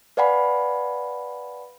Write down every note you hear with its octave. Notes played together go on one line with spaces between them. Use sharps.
B4 D5 F5 F#5 G#5 B5